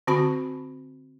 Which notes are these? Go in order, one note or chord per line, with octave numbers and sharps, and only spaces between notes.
D3 C4 F#4 G#5 B5